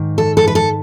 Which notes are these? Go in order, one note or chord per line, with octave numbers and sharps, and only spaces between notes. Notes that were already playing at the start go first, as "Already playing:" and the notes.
Already playing: G#2 D#3
A4
A4
B4
A4